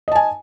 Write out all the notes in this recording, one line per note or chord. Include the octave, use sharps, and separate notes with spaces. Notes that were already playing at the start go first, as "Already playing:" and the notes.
D#5 G#5 A5